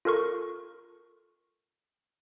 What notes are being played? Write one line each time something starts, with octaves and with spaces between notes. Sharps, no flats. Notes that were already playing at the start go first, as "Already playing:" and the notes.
F4 A4 A#4 C#6